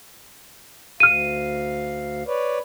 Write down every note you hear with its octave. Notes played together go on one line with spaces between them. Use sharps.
D2 F5 F6 D#7
B4 C#5 D5